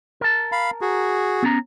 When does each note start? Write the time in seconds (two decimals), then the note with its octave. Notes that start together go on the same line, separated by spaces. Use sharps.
0.21 A#4 A5
0.52 F5 B5
0.81 F#4 G#4
1.43 B3 C#4 A#5